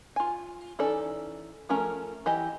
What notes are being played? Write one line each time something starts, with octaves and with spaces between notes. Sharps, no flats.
F4 G#5
E3 C#4 D#4 A4 D5
F3 A3 C#4 A#4 A#5
E3 G4 D#5 G#5